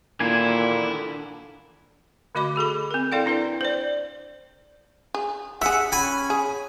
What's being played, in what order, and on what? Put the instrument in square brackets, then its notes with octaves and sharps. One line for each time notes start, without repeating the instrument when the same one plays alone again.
[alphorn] A#2 [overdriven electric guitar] D3 D#3 [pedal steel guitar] A#3 D4 G#5 [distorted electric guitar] E4
[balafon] D3 A3 F#4 D#5 B5 D6
F#4 G#4 A4 B5
C4 A#4
E4 A4 D5 F5 G5
D4 E4 B4 G5
C5 D5
[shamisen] G#4
[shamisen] G3 G#4 [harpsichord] E5 [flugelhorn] F#5
[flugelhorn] C#4 [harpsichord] G#5 B5
[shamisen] G#4